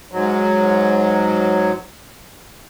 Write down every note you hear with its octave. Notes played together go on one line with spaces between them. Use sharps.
G#2 F#3